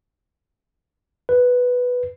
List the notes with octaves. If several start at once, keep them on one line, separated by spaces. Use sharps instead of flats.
B4